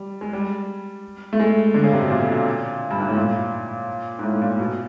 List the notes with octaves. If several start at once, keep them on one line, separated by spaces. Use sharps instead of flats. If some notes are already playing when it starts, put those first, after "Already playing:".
Already playing: G3
G#3
G3
A3
G#3
D3
C#3
C3
B2
A#2
G2
G#2
A2
A#2
G#2
A2
A#2
B2